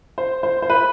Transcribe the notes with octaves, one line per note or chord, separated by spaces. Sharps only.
C5
C5
C5
B4